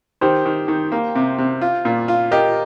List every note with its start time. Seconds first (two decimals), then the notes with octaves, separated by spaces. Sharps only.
0.21 D#3 G4 C5
0.45 D#3
0.68 D#3
0.92 A#3
1.15 C3
1.38 C3
1.61 F4
1.85 A#2
2.08 F4
2.31 G4 A#4 D#5